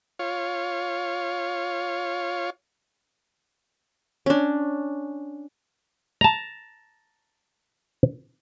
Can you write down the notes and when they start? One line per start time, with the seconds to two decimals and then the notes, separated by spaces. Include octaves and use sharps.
0.19 F4 C#5
4.26 C#4 D4
6.21 A5 A#5